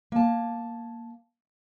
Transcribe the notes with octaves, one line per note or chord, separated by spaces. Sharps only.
A#3 A5